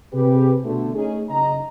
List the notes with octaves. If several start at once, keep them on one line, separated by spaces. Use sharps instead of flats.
C3 G4 G#4 B4
B2 D3 A3
A3 C#4 D#4 G#4
F#1 C#3 D#4 D#5 A#5